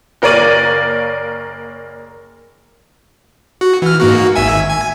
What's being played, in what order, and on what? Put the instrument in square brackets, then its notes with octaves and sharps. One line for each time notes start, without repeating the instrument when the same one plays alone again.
[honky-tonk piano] F#1 A#3 A#4 C#5 D5 D#7
[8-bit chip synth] F#4
E3 F6
G#2 A#3 F#4
G#1 E5 G#5
G#5